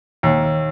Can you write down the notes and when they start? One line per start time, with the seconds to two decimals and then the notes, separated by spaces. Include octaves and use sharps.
0.23 D#2